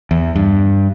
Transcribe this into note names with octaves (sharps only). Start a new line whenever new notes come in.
E2
G2